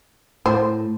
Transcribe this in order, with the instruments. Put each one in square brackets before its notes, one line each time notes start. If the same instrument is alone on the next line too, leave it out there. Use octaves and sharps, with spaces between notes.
[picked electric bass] A2 [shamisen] C5